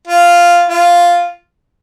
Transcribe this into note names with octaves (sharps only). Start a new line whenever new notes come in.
F4
F4